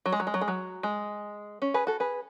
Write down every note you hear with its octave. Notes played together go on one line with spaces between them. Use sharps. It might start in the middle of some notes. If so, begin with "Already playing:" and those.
F#3
G#3
F#3
G#3
F#3
G#3
F#3
G#3
C#4
G#4 B4
F#4 A4
G#4 B4